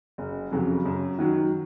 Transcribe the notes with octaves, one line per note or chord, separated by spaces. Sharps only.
F#1
F2 C#3 F#3
F#2
D#3 F#3